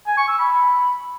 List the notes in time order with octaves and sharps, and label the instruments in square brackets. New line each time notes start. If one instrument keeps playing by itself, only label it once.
[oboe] G#5
C#6
E6
B5